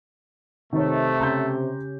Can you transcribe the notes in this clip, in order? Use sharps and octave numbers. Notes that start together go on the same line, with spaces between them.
C3 D#3 A3 D#4 C#5
C#3 C#4 G4 A#5 C6 G6